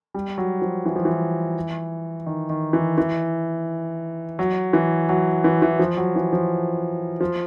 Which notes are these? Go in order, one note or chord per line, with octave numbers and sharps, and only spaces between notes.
G3
F#3
F3
E3
F3
E3
D#3
D#3
E3
E3
F#3
E3
F#3
E3
E3
F3
F#3
E3
F3
F3